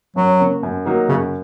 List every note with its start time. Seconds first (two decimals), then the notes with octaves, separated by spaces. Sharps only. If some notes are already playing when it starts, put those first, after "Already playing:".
0.16 F#2 F#3
0.40 C#3 A#3
0.63 F#2
0.85 F#3 A#3 D#4
1.09 F#2 C#3